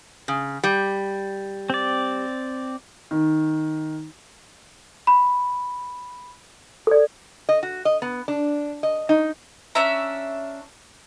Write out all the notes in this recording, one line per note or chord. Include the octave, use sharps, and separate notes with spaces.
C#3
G3
C4 D5
D#3
B5
A4 D5
D#5
F#4
D#5
B3
D4
D#5
D#4
C#4 D4 E5 A#5